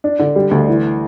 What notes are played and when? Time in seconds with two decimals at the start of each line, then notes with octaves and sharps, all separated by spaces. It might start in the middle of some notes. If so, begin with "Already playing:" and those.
0.04 D4
0.19 D3
0.36 G3
0.51 D2
0.68 E3